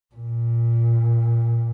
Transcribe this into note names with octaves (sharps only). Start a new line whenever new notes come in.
A#2